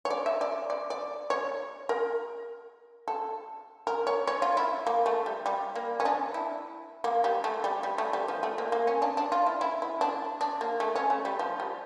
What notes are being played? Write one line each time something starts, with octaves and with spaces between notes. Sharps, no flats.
C#5
D5
E5
D5
D5
D5
C#5
A#4
A4
A#4
C#5
C#5
F4
E4
A#3
A3
G3
G3
A#3
C#4
D4
E4
A#3
G3
A3
G3
G3
A3
G3
F3
A3
A#3
A#3
C#4
D4
D4
F4
E4
E4
E4
D4
D4
A#3
A3
C#4
A3
G3
F3
G3